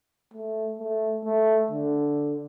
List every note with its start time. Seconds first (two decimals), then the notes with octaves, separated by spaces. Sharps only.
0.34 A3
0.79 A3
1.25 A3
1.71 D3